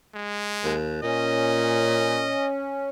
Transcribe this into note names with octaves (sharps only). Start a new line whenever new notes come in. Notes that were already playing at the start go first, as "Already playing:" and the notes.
G#3
D#2
A#2 C#4 D#5